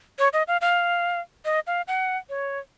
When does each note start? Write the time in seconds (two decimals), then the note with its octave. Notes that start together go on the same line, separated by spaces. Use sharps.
0.19 C#5
0.33 D#5
0.48 F5
0.61 F5
1.45 D#5
1.67 F5
1.88 F#5
2.30 C#5